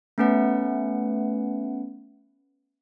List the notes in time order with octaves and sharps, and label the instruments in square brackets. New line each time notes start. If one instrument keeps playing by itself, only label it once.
[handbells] A3 B3 C#4 B4 F#5